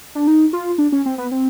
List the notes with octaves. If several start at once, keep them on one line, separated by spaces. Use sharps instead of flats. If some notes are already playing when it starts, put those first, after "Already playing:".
D4
D#4
F4
D4
C#4
C4
B3
C4